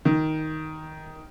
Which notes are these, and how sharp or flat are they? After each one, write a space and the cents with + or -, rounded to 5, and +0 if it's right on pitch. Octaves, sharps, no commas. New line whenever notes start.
D#3 +10